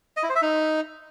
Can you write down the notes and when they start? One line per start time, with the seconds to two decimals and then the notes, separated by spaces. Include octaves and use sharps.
0.17 D#5
0.23 E4
0.29 C5
0.36 E5
0.42 D#4